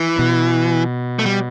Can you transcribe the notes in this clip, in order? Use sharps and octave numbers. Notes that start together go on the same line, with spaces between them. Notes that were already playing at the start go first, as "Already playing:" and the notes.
Already playing: E3
B2
A3
G3